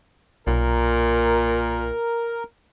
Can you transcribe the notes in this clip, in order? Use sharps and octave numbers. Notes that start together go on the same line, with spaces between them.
B1 A#2 A#4